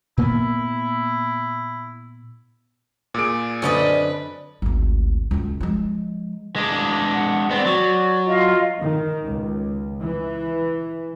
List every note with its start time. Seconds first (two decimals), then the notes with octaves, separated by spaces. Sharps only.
0.18 A#2 A#3 B3 E4
3.14 A#2 G#4 D6 D7
3.62 F#2 D3 C4 C#4 B4 D5 D#5
4.62 G#1 D2
5.31 C#2 F#2
5.61 F3 G#3
6.56 G#3 D4
7.12 F#5
7.50 B3 C4 D5
7.66 F#3
8.25 F4 D#5
8.81 D#3
9.27 C#2
10.02 E3